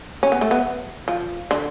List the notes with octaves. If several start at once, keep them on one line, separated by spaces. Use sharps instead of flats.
C#4
B3
A3
B3
F3
D3